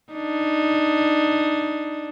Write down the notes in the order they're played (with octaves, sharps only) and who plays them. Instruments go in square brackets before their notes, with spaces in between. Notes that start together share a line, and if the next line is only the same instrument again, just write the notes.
[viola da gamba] D4 D#4